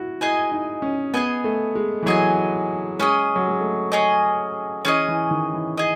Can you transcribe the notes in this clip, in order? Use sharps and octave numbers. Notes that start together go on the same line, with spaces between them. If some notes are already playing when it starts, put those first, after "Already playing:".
Already playing: E4 F#4
E4 G#4 D#5 G#5
D#4
C#4
B3 G#4 D#5 G#5
A3
G#3
E3
F#3 G#4 D#5 G#5
G#3 C#4 G#4 D#5
F#3
G#3
A3
C#4 G#4 D#5
E3 C#4 G#4 D#5
E3
D#3
E3
G#4 D#5